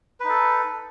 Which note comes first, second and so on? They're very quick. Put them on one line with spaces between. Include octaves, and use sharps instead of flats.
B4 D#4 A4